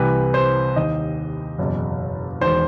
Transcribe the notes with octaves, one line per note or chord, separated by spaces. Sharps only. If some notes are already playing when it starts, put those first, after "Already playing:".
Already playing: C2 C3 E3 B4
C5
D#2 D#3 D#5
F#1 E2 B2
E1 E2 D#3 C5